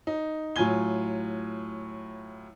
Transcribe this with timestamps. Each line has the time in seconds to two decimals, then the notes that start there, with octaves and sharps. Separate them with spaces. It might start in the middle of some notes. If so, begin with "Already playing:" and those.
0.07 D#4
0.56 A2 F#3 F4 G#5 G#6 G7